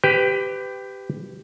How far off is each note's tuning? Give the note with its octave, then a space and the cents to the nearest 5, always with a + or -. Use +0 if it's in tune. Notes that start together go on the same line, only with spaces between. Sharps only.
G4 +0 B4 +25 G5 +5